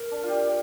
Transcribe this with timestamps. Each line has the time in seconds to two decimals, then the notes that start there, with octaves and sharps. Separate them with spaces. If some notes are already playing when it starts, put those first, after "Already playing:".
Already playing: A#4
0.11 D4
0.23 F4 G4